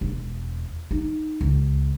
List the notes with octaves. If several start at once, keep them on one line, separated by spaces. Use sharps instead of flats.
E1
D#4
C#2